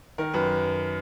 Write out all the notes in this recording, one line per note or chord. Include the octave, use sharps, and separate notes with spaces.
D#3 A#4
F#2 B4